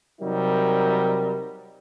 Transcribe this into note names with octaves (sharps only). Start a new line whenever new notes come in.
C3 F#3 G3 D#4 A#4